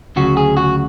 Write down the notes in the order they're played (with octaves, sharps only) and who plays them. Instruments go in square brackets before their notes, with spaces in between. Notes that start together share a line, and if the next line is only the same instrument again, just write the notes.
[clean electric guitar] D2 C#3 F#3 F#4
G#4
F#4